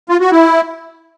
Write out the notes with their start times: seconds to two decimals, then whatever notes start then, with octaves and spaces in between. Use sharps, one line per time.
0.09 F4
0.20 F#4
0.31 E4